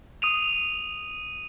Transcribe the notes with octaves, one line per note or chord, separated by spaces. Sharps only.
D#6 D#7 F7